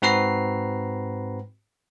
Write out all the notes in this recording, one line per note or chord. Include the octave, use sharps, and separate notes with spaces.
G#2 C4 F#4 B4 A#5 C7